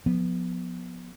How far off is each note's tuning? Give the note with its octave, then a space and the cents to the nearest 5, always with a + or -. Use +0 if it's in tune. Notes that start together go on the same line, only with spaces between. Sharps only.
F3 +35 B3 -5